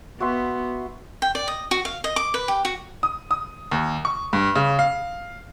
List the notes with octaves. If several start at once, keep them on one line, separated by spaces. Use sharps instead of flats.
B3 F#4 E5 C6
G5
D5
D#5
F#4
F5
D#5
D6
B4
G4
F#4
D#6
D#6
D#2
C#6
G2
C#3
F5